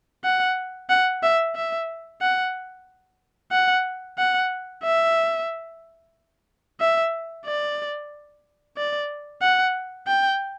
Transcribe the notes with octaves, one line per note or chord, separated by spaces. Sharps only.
F#5
F#5
E5
E5
F#5
F#5
F#5
E5
E5
D5
D5
F#5
G5